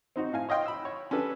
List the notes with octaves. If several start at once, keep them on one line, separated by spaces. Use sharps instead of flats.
C4 D#4 F#4
A2 F5 G#5
C#5 D#5 F5 G5 C6
B5 E6
C#5
C#4 D4 G4 A4 B4